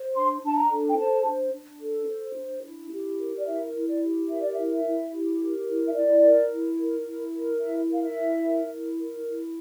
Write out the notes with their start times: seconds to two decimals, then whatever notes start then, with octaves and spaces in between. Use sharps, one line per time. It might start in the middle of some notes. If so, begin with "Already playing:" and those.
Already playing: C5
0.14 D4 C6
0.42 D4 A5
0.56 A#5
0.69 A4
0.89 G5
0.97 C5 A5
1.25 D4
1.53 D4
1.80 A4
2.07 C5
2.35 D4
2.63 E4
2.90 G4
3.19 A#4
3.38 D5
3.46 E4 E5
3.74 E4
3.87 D5
4.02 G4
4.29 A#4 E5
4.42 D5
4.54 E4 E5
4.71 E5
4.84 E4
5.12 G4
5.40 A#4
5.67 E4
5.88 E5
5.94 E4 D5
6.22 A#4
6.50 E4
6.77 A#4
7.05 E4
7.33 A#4
7.60 E4 E5
7.88 A#4
7.93 F5
8.02 E5
8.15 E4
8.44 A#4
8.71 E4
8.99 A#4
9.26 E4